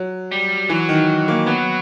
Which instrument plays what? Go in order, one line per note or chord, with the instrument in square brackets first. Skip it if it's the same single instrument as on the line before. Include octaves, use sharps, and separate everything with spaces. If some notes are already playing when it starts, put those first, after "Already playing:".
Already playing: [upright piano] F#3
[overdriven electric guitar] G3
[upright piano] E3 [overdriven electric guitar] F#3
[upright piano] D#3
A#3
[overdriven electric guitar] F#3 [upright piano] B3